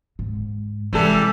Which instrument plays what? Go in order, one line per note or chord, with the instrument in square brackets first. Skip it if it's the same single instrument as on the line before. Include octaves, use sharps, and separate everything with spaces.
[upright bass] G#2
[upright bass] C3 G#3 [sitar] E3 G3 A4